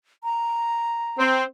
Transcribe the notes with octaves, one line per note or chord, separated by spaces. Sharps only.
A#5
C4